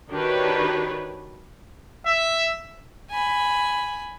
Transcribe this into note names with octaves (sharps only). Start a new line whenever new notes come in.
D#3 D4 F#4 G4 B4 C#5
E5
G#5 B5